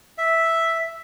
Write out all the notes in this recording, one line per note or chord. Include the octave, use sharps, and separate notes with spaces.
E5